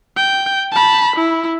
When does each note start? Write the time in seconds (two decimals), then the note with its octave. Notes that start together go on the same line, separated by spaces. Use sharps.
0.17 G5
0.72 A5 B5
1.16 E4